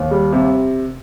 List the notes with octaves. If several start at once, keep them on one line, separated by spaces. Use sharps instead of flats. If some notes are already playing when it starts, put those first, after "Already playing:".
Already playing: D#2
G3
C3